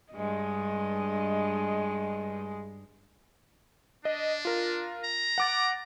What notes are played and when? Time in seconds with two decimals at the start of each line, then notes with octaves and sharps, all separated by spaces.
0.13 G2 G#3 D#5
4.05 D4 D#5
4.45 F4 A#4
5.05 A#5
5.38 F#5 D6 A6